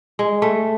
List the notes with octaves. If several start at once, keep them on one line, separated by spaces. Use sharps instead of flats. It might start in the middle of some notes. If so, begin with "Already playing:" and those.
G#3
A3